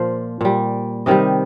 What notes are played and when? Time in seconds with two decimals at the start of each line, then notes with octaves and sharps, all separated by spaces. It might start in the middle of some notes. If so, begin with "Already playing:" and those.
Already playing: A#2 F3 C5
0.41 A#2 G3
1.06 C3 D#3 G3 D#5